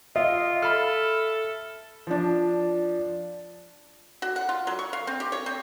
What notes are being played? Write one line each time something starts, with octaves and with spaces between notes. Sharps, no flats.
F4 D#5 E5
A4 B5 F6
F3 D4
F#4
F#5
F4
F#3
C#6
F5
C4
G4
C#5
C4